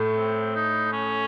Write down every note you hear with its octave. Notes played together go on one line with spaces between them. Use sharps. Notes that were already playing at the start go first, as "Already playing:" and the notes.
Already playing: A2 A3
C4
D#4
C#4